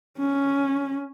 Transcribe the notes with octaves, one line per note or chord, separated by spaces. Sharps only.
C#4